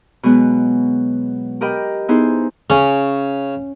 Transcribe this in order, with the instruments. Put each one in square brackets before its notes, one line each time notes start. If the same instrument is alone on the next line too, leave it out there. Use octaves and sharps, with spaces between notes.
[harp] B2 F#3 G#3 B3
G4 A#4 D#5 G5 B5
B3 D#4 E4 G#4 C5
[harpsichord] C#3 [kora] C#4